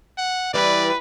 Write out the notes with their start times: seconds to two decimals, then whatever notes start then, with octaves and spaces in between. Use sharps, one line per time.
0.18 F#5
0.54 E3 G3 B4 D5